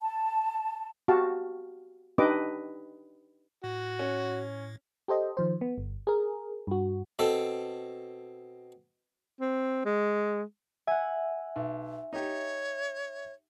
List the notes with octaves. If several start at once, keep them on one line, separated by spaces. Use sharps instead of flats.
A5
F#4 G4 F5 A5
D4 D#4 G4 B4 D#5 D6
A2 F#4
C#4
G4 A4 C5 D#5
D#3 F3 C5
B3
G1
G#4 A#4
G2 F#4
B2 C4 A4
C4
G#3
E5 F#5 G#5
B1
D#4 G4 C#5